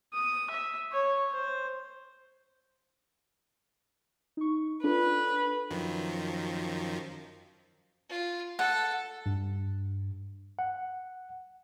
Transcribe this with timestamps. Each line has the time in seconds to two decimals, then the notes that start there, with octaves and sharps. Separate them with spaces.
0.14 D#6
0.51 E5
0.92 C#5
1.31 C5
4.37 D#4 C#6
4.84 D4 F4 A4 B4
5.70 F#2 D#3 F3
8.10 F4
8.59 A4 F#5
9.26 G2
10.59 F#5